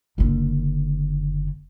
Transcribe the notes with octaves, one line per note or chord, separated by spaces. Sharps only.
F#1 D3